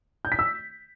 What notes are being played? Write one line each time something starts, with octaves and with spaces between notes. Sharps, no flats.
G6
B6
E6